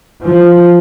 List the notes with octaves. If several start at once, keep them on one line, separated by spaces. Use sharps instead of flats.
F3